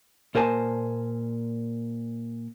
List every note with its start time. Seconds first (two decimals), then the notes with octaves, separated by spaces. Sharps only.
0.35 A#2 A#4 C5 G#5 A5